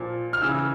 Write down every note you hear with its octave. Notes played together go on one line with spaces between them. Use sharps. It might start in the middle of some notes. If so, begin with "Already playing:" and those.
Already playing: A#2 F3
F6
C#3 E3 E6